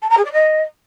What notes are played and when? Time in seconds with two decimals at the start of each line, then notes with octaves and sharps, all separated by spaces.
0.02 A5
0.10 A#5
0.17 G#4
0.25 D5
0.33 D#5